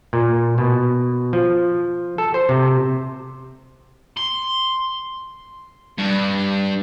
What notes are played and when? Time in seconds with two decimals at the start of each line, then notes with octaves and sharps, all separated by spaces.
0.13 A#2
0.58 B2
1.33 F3
2.18 A4
2.34 C5
2.49 C3
4.17 C6
5.98 G2